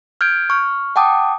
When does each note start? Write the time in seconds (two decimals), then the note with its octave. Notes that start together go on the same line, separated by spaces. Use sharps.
0.21 F6 G6 G#6 D7
0.50 C#6 F6
0.96 F#5 G5 A5 D6 D#6